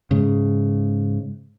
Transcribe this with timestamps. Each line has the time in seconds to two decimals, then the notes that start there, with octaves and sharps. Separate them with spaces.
0.11 G#2 C#3